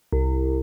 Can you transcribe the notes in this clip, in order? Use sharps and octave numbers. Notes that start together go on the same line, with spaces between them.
C2